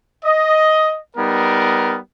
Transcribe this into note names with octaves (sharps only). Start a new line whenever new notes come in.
D#5
G3 B3 D#4 A#4